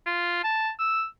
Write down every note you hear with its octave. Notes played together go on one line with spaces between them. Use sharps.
F4
A5
E6